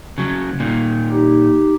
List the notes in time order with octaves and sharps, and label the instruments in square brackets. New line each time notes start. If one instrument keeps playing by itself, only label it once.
[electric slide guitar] C#3 F#3
A#2 D#3
[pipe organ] D#4 G4